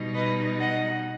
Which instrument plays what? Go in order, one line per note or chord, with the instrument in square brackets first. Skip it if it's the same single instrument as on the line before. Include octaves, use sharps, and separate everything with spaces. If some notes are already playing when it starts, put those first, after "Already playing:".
Already playing: [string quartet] B2 G3 D#4
B4 D#5
D#5 F#5